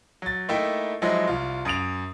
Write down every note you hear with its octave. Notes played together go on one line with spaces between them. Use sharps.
F#3 A6
A3 A#3 D#4 E4 E5 G5
F3 F#3 G#3 D#4 E4
C2 F4
F#2 D#6 D7 F7